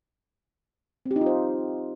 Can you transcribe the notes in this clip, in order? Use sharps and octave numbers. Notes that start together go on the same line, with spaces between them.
C4
G4
D#4
F4
C5